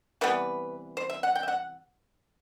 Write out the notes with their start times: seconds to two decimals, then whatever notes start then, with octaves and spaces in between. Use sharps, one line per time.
0.21 C3 E3 G3 B3 B4
0.97 C5
1.10 E5
1.23 F#5
1.35 G5
1.43 E5
1.48 F#5